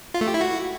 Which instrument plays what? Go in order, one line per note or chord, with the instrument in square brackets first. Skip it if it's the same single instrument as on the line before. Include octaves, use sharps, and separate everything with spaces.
[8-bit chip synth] F4
A3
G4
E4
F#4